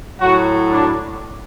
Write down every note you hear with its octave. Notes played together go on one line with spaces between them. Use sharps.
A2 F#3 F#4
D4